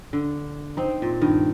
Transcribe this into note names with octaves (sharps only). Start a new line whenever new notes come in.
D3
C4 D#4
A#2
G2 D#3